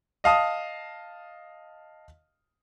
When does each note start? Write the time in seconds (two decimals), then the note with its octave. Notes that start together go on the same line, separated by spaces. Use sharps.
0.24 D#5 F5 A5 D#6